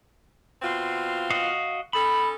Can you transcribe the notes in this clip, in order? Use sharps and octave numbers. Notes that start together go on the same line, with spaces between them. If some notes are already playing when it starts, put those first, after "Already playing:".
B2 C4 F4
F#4 D#5 F5
C#4 D#4 A4 B5